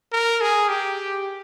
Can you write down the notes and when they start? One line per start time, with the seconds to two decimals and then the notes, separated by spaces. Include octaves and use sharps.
0.13 A#4
0.41 G#4
0.69 G4